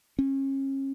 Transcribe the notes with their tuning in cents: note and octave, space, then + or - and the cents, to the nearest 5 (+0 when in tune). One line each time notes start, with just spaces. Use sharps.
C#4 -35